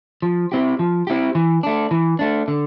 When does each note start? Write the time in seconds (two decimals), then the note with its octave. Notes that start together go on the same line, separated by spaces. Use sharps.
0.22 F3
0.52 C4 E4 G4
0.79 F3
1.07 C4 E4 G4
1.35 E3
1.63 A3 D4
1.91 E3
2.19 A3 D4
2.48 D3